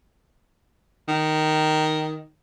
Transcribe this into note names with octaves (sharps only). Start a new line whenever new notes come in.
D#3